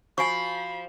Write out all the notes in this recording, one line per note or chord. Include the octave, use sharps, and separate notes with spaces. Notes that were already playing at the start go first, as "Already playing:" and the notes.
F3 F#4 G#5 B5 C#6 C7